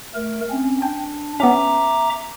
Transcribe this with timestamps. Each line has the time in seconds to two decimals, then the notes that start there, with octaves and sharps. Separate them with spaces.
0.15 A3 A#4
0.51 C4 C#4
0.82 D4 G5
1.40 B3 C#4 E5 A#5 D6